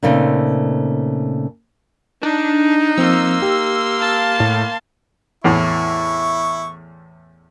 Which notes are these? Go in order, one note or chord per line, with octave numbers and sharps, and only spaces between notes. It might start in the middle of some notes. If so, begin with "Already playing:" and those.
A#2 C#3 A3 C4 D#4
D4 D#4
F3 A#3 C4 C6 E6
G4
F5 A5
A2
E2 A2 E4 C#6